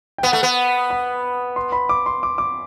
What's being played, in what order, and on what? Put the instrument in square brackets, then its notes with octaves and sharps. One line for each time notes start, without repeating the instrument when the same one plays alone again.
[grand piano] G5
[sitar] B3 [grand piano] F#5
[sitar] A3
B3
[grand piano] B5
C6
B5
D6
C6
D6
D6